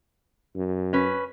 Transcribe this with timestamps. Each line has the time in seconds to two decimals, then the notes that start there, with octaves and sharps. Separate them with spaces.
0.56 F#2
0.93 C#4 B4